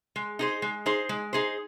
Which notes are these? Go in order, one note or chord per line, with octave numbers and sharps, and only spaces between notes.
G#3
D#4 G#4 C5
G#3
D#4 G#4 C5
G#3
D#4 G#4 C5